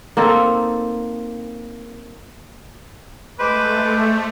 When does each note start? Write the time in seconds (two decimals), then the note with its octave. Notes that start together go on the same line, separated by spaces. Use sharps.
0.17 A#3 C4 D#4 A4
3.39 G#3 A3 B4 C5 D6